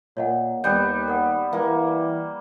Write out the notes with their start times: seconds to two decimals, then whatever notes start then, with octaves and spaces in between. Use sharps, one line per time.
0.17 A#2 C#5 D#5 F#5
0.64 D#2 G3 B3 G6
1.08 A#4 F#5
1.53 E3 A#3